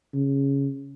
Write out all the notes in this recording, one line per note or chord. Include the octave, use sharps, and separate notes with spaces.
C#3